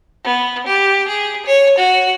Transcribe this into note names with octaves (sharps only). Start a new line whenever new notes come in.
B3
G4
G#4
C#5
F#4